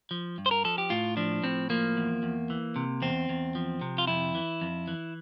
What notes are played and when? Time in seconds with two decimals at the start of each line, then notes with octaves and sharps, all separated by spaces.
0.11 F3
0.38 G2
0.46 C5
0.51 A#4
0.64 F3 A4
0.78 G4
0.90 A2 F4
1.17 F3 D4
1.43 A2 C4
1.70 F3 A#3
1.97 E2
2.23 E2
2.50 E3
2.76 C3
3.02 E2 C4
3.29 E2
3.55 F3
3.81 C3
3.98 F4
4.07 F2 E4
4.35 E3
4.62 F2
4.88 E3